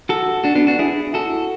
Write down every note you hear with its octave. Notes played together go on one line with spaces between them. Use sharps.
F#4 A4
D4 F#4
B3 D4
D4 F#4
E4 G#4
F#4 A4